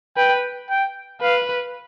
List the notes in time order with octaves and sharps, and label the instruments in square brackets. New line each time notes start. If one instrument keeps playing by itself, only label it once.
[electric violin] B4 [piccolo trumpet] G5
[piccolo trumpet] G5
[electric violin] B4 [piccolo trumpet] F5